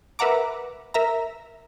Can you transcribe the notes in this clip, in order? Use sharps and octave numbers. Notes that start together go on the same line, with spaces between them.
A#4 B4 E5 F#5 A#5 D6
A#4 E5 A#5